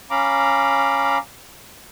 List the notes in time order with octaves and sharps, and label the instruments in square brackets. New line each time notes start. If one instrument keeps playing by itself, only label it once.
[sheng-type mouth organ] C#4 F5 A#5 B5 D6